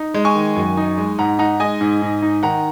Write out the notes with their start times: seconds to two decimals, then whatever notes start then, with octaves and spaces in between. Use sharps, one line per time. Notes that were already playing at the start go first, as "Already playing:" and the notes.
Already playing: D#4
0.14 G#3
0.25 G#5 C#6
0.35 D#3
0.56 F#2
0.77 D#4
0.98 G#3
1.18 G#2 F#5 A#5
1.39 D#4 F#5 A#5
1.60 G#3 D#5 G#5
1.81 G#2
2.02 G#2
2.22 D#4
2.43 D#3 F#5 A#5